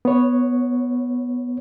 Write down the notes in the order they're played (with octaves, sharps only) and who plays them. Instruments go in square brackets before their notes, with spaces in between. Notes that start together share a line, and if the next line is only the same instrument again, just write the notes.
[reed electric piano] B3 C#5